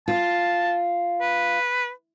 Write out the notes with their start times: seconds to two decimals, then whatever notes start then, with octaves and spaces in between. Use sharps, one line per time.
0.08 F4 A5
1.21 B4